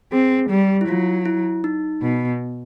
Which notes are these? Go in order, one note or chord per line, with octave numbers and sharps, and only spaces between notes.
C4 G#4
G3 G4
E4
F#3 F4
E4
D#4
B2